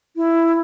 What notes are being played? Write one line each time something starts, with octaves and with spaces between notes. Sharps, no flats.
E4